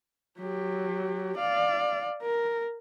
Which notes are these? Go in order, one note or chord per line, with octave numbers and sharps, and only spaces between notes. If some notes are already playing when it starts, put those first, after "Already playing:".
F#3 G4
D5 F5
A#4